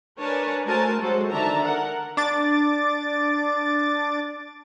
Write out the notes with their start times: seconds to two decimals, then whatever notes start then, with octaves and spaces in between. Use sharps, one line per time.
0.18 D4 A#4 B4 C#5 G#5 A5
0.65 A3 F#4 A#4 C5 G#5 A5
1.00 F#3 G#3 F#4 A4 C5
1.32 D3 D#3 D4 E5 A5 A#5
1.64 A#4 F#5
2.17 D4 D6 A6